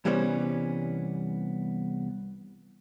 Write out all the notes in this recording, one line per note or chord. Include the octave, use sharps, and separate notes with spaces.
C2 E3 G3 B3 C#4 C5